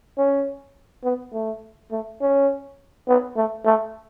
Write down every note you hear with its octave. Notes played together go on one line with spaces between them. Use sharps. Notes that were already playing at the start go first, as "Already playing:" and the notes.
C#4
B3
A3
A3
C#4
B3
A3
A3